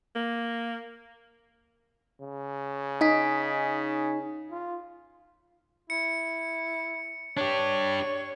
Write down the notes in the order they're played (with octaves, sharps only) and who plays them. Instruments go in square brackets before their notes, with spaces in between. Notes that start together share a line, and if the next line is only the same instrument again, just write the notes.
[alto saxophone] A#3
[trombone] C#3
[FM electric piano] D#4 [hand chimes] G#5 D#6 B6
[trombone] F4
[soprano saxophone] E4 [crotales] C#7
[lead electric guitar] D4 G4 [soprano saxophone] C#5